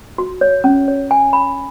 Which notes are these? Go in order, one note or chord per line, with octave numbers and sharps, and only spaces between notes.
F#4
C#5
C#4
C#5
G#5
B5